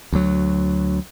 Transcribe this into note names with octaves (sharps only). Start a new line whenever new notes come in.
D2 F#3